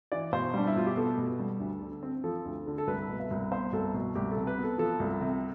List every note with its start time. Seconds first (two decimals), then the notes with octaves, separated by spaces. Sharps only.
0.12 E3 D5
0.32 B2 C5
0.54 G3 D4
0.67 E4
0.76 B2 F4
0.87 G4
0.97 B3 A4
1.18 B2
1.39 G3
1.60 D2
1.82 D3
2.03 C4
2.24 F3 A4
2.45 D2
2.67 D3
2.78 A4
2.87 C2 B4
3.09 B2
3.20 E5
3.31 C2
3.51 B3 C5
3.73 C2 A4
3.94 B2
4.15 C2 G4
4.31 A4
4.37 C3
4.47 B4
4.58 B3
4.63 A4
4.78 F3 A4
5.00 C2
5.21 C3